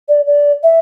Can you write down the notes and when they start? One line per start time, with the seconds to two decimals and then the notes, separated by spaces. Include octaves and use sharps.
0.09 D5
0.27 D5
0.63 E5